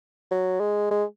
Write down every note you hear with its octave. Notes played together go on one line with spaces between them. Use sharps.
F#3
G#3
G#3